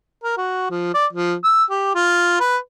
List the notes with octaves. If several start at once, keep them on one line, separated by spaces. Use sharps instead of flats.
A#4
F#4
F3
D5
F3
E6
G4
F4
B4